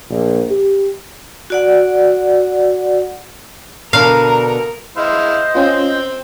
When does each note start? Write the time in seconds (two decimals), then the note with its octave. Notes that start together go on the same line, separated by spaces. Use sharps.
0.11 A#1
0.50 G4
1.50 F#4 D5 F#5
3.93 B2 D3 D4 A#4 F5 A#5
4.97 G#3 E4 C5 D#5 F5
5.55 C4 C#4 F4 G5